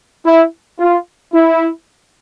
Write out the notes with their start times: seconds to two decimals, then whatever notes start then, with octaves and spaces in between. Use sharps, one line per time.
0.25 E4
0.79 F4
1.34 E4